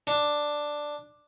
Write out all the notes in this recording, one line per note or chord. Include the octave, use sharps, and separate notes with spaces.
D4